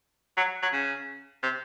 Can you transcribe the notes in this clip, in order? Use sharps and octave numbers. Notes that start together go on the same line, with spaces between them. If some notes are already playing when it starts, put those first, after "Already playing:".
F#3
F#3
C#3
C3